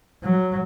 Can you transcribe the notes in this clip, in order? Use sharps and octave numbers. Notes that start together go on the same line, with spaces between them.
F#3